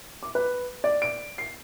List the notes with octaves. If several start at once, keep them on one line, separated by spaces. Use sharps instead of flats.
D6
B4
D5
D7
C7